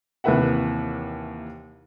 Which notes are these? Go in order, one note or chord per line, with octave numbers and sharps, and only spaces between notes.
D#2 C3 E3 B4 E5 F#5